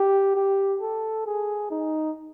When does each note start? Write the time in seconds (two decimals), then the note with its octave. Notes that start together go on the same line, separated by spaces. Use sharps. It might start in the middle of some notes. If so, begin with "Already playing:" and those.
Already playing: G4
0.35 G4
0.81 A4
1.26 G#4
1.71 D#4